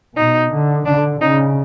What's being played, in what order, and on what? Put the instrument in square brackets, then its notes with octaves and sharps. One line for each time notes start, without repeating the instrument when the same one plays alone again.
[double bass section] B2 [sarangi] D#4
[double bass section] D3
[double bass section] D3 [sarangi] D4
[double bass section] C#3 [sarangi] D#4